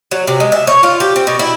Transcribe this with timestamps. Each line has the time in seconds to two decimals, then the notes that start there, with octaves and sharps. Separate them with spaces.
0.11 F#3
0.27 C3
0.40 G#3
0.52 E5
0.67 C#5
0.83 F4
1.00 G4
1.16 C4
1.27 B2
1.39 E4